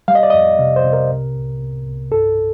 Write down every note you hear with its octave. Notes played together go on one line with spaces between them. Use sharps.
G3 F5
D#5
D5
F2 D#5
C3
C5
C3
A#4
C2
C2
C2
C2
G2 A4